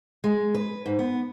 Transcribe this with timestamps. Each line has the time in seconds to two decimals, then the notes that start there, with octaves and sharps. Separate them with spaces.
0.24 G#3
0.54 B4
0.86 G#2
0.99 B3